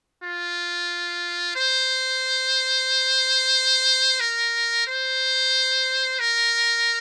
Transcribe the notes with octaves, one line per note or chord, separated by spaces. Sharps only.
F4
C5
A#4
C5
A#4